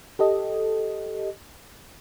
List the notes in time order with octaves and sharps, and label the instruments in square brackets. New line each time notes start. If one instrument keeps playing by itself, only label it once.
[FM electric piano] G4 A4 D#5